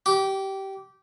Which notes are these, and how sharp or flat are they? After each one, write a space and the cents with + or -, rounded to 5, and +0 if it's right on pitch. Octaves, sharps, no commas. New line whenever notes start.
G4 -20